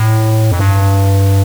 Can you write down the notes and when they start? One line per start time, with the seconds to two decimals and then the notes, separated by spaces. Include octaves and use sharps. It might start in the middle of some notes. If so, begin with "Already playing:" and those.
Already playing: A2
0.52 F2
0.59 G2